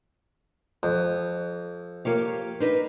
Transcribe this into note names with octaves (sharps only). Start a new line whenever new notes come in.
F2
A#3 F4 G4 C#5 F5
D4 D#4 B4 C5